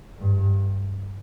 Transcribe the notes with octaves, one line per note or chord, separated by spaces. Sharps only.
G2